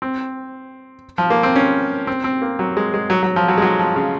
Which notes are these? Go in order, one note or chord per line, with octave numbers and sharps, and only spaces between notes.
C4
F3
A#3
C4
C#4
C4
C4
A#3
F#3
G#3
G#3
F#3
F#3
F3
F#3
G#3
F#3
F3
C#3